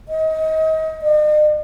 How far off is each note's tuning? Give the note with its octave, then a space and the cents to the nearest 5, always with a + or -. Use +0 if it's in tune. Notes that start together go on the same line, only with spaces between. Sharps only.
D#5 +30
D#5 -45